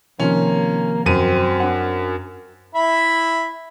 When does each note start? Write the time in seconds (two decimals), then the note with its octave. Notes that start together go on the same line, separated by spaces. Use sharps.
0.20 C3 D#3 F3 A#3 C#4
1.06 F#2 C4 D#7
1.60 D4 F#5
2.75 E4 E5 B5